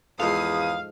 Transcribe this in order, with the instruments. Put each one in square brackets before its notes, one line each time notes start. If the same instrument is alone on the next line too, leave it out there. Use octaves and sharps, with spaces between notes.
[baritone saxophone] E2 [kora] G#2 F3 A4 [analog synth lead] F5 [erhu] D#6